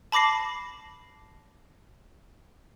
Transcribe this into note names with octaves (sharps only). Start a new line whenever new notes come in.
A5 B5 D6 A#6 C7